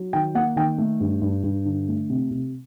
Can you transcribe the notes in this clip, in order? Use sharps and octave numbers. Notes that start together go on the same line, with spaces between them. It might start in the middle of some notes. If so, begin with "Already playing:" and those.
Already playing: F#3
D#3 G5
A#3 F#5
D#3 G5
A3
G2
G2
G2
D3
A3
C3
C3